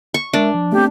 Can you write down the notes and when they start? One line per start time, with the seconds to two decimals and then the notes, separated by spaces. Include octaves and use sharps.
0.14 C#6
0.33 G#3 D4 A#4 E5
0.54 F3
0.72 A3 B3 C4 G4